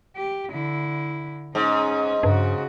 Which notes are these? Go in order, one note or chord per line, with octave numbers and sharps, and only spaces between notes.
G4
D3 E4
G#2 C#4 D#4
G2 C#3 F#4